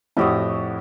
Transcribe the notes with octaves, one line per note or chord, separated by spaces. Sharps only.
F2 A2 E4 F#4 G4 D#6